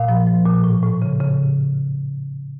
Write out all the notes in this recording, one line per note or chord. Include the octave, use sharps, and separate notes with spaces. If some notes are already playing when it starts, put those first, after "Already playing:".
Already playing: A#2 F5
F3
F3
A#2
A2
A2
C#3
C#3